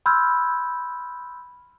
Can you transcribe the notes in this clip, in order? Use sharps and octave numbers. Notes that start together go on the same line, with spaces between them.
B5 C6 E6 F6 G6 G#6